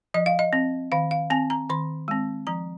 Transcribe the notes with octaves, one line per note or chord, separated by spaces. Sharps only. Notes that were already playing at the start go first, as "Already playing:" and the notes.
F3 D#5
F5
D#5
C4
D#3 F5
F5
C4 G#5
A#5
D#3 C6
G#3 C4
F3 A#5